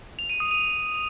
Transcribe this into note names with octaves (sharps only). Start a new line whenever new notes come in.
F7
D#7
D#6
D#7